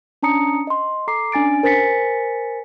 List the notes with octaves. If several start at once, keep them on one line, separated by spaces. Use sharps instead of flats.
C#4 D4 A5 A#5 D#6 C#7
D#5 C6
A4 A#5 D6 C7
C#4 D4 G#5 A6 D7
A#4 C5 G#5 A6 B6 C#7